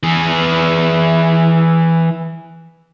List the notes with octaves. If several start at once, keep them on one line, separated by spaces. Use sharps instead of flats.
E3 G#4